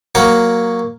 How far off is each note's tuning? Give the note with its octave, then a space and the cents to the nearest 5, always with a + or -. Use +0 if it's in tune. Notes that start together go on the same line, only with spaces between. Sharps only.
F#3 +0 A#3 +0 F#5 +0